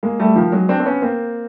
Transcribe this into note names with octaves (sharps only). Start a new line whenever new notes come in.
G#3 A#3
G3 A3
D#3 F3
F#3 G#3
C4 D4
C4
B3 C#4
A#3 C4